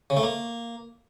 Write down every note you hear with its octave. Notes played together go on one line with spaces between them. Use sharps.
C#3
A3
A#3